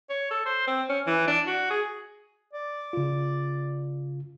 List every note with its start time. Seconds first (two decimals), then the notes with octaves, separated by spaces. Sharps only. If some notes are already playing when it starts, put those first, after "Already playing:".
0.10 C#5
0.31 A4
0.46 C5
0.68 C4
0.89 C#4
1.07 E3
1.28 D4
1.47 F#4
1.71 G#4
2.54 D5
2.93 C#3 F4